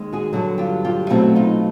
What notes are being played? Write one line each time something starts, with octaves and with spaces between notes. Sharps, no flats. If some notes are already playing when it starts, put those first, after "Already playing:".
Already playing: D#2 D#3 G#3
F#4 G#4
G2 D3 F#3
F4 G4
F4 G4
B2 F#3 A3 C4 E4 F#4
D#4 F4